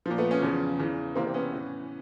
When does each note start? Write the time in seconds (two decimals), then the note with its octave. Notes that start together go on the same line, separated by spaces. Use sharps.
0.06 A#2 F3
0.18 A3 B3
0.31 B3 C#4
0.42 E2 C#3 F3
0.79 E2 C#3 E3
1.16 E2 C3 E3 A#3 C4
1.27 C4
1.34 B3 C#4
1.53 A2 E3